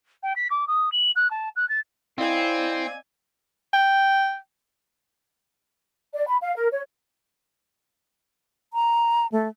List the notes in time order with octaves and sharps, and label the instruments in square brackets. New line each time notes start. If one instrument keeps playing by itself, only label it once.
[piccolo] G5
B6
D6
D#6
F#7
F#6
A5
F#6
A6
[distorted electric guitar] C4 [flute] E4 [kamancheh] D5 G#5 [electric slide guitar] D#5 F5
[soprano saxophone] G5
[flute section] D5
B5
F5
A#4
C#5
[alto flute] A#5
A3